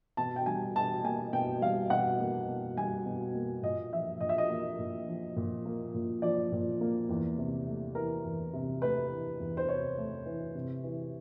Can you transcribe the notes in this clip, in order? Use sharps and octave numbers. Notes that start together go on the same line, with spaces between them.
B2 A5
G5
G3 G#5
B2 A5
A#3 G#5
B2 G5
G3 F5
B2 F#5
A#3
B2
G3 G#5
B2
A#3
A#2 D#5
F3 E5
A#2 D#5
E5
D#5
A#3
A#2
F3
A#2
A#3
A#2
F3 D5
A#2
A#3
E2
C3
A3
E3 A#4
E2
C3
A3 B4
E3
E2
C5
C3 C#5
A3
E3
C3
E3